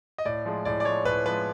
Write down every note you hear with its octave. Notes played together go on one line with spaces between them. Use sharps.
D#5
A2 D5
F3 G#3
A2 D5
D5
F3 G#3 C#5
A2 B4
F3 G#3 B4